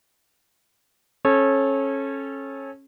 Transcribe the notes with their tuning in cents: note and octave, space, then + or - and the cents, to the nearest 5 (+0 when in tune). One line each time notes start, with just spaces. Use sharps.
C#4 -25 A4 -25 C#5 -25